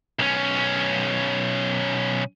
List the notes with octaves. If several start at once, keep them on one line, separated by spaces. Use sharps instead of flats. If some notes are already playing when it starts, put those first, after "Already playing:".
B1 C#4